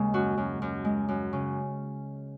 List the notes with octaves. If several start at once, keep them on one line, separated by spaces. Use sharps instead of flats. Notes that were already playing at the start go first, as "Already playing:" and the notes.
Already playing: D#2 C#3 G#3
F#2 F#4
F#2
F#2
G#3
F#2
C#3